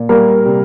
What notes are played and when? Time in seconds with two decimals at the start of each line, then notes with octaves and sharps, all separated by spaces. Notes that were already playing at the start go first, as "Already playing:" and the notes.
Already playing: A#2
0.09 G3 A#3 A#4
0.46 C3